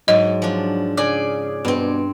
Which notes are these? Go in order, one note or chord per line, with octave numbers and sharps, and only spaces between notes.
G#2 F#3 D#5
F3 D4
C#3 G#4 D5
G2 B2 C4